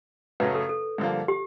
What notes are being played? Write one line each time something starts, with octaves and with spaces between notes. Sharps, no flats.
F#2 C#3 F#3 A3 C#4 B4
A4
A4
G2 D3 F3 A#3
G4